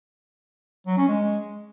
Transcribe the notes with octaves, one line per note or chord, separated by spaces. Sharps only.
F#3
C#4
G#3